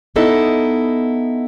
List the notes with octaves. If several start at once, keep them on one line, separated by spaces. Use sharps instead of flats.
B3 D#4 E4 A4 D#5